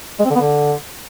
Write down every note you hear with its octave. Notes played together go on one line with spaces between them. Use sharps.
G#3
C4
D3
B3
D3